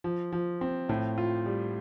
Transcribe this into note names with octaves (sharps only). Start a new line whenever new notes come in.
F3
F3
C4
A2
F4
G3